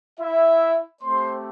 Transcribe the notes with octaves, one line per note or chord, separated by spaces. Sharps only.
E4 E5
A3 C4 G4 C5 C6